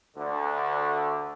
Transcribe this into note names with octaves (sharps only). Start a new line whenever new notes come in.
D2 D3